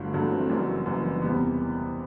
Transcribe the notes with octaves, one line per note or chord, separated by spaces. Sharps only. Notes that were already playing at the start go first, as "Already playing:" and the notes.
Already playing: G1 G2 D3 F#3 A3
G1 G2 D3 F#3 A3
E3
C4
A3
F#1 F#2 E3 G3
F#3
F#3
F#1 F#2 E3
E3
E2 C3 E3 G3 B3